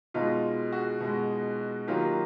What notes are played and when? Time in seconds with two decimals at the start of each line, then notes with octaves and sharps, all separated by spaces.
0.14 B2 G#3 D#4 F4
0.72 F#4 G#4
1.00 B2 G#3
1.87 D#3 F#3 A#3 F4 G4